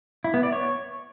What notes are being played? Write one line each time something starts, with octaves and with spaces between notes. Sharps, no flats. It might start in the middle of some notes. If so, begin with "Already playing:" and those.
E4
B3
D5
C#5